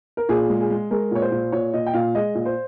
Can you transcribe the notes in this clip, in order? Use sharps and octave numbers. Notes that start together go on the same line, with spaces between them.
A#4
A#2 G#4
G#3
G#4
G#3
G#3 A#4
A#2 C#5
C5
A#2
A#2 C#5
A#2 D#5
G5
A#2 F5
G#3 D#5
A#2
C5